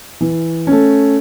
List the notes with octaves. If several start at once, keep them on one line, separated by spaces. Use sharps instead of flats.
E3
A3 C#4